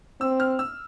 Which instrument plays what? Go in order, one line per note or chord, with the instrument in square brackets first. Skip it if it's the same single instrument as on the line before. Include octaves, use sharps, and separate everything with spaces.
[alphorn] C4 [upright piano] E6
[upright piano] F6
E6